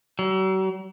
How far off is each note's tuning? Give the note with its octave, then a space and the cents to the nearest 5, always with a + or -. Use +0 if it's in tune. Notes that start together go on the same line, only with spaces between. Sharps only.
F#3 +40